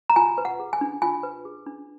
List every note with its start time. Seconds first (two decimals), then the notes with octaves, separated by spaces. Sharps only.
0.10 A#5
0.16 F4 G#5
0.38 B4
0.45 F#5
0.60 G#4
0.73 G#5
0.81 D4
1.02 F4 G#5
1.23 B4
1.45 G#4
1.66 D4